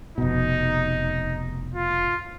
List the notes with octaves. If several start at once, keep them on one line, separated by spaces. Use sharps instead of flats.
F1 B2 D#4
F4